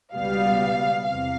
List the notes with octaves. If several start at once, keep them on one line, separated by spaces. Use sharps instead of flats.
C#2 B2 G3 B3 F5
E2 C3 F5